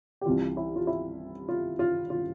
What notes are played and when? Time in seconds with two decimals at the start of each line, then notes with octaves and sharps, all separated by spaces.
0.21 G4
0.26 C2 C3 E3 F4
0.57 E4
0.76 F4
0.87 E4
1.49 F4
1.79 F4
2.10 F4